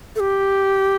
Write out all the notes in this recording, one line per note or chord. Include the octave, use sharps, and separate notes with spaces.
A4
G4